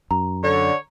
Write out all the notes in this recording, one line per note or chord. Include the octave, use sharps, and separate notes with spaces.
F#2 A#5
D3 C#5